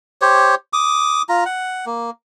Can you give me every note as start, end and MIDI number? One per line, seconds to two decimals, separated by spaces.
0.22 0.55 67
0.22 0.55 72
0.22 0.55 73
0.73 1.22 86
0.73 1.22 87
1.29 1.44 65
1.29 1.44 82
1.46 1.85 78
1.86 2.10 58